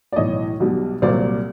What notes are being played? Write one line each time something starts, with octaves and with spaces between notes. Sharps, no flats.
D5
B1 A2 E3 C#5 D#5
B1 B2 G3
C2 A#2 F#3 C5 D5